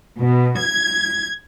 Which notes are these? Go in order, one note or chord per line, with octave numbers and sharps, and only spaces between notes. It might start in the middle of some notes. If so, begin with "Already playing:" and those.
B2
G#6